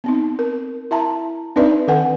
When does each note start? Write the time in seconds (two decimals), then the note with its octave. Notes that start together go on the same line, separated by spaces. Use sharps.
0.04 B3 C4 D#4
0.39 A#4
0.91 E4 E5 A5 A#5
1.56 C4 D4 D#4 B4 D5 E5
1.88 D#3 A4 B4 F#5 G#5